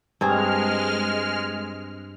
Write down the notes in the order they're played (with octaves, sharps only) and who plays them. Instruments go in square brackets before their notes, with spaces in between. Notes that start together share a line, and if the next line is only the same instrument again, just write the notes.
[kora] G2 C4 G#4 [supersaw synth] G#3 F6